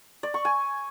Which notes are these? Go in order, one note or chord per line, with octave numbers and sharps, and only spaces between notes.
D5
C#6
G#5